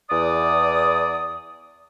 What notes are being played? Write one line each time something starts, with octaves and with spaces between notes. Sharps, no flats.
E2 D5 D#6